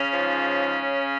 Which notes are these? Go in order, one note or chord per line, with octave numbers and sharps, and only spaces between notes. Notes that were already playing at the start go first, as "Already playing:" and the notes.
Already playing: C#3 C#4
G#2 F3